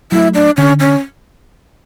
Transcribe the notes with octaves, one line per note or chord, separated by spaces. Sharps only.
F#3 A3 E4
D4
D3 C#4
C#4